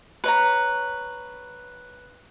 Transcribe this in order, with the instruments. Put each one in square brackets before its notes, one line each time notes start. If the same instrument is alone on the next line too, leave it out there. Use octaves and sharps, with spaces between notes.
[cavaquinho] B4 C#5 A#5